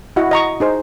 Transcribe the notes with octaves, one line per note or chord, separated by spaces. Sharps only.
E4 F#4 D#5 F#5
D#5 A#5 C#6
D#4 G#4 C5